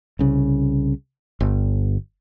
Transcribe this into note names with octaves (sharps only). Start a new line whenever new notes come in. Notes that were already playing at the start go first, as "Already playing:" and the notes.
C2 C#3
G1